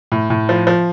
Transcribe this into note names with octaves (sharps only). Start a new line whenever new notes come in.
A2
A2
F3
F3